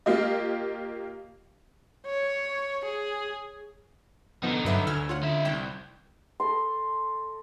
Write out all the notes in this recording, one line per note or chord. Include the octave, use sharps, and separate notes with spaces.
A#3 F4 G4 D#5
C#5
G#4
D3 F3 B3 D#4
G2 F#3 B4 E5
D2 D3 G#5 E6 F6
F4 C#5 F#5
D#4 E5
C2 G5
A4 D#5 C6